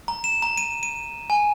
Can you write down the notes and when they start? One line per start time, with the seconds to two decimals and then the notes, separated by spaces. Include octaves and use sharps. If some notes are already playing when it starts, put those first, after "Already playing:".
0.08 A#5
0.24 E7
0.42 A#5
0.57 D#7
0.83 D#7
1.30 G#5